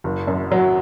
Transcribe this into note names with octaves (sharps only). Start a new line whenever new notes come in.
F#1
F#2
F#3